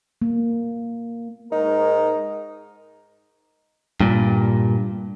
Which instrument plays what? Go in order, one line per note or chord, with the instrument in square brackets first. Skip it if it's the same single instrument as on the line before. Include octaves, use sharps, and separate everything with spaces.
[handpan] A#3
[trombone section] G#2 A#4 [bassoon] D#4
[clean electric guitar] G2 A#2